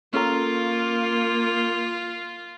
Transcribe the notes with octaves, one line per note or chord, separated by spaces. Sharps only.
A#3 C#4 F4 A4 A#5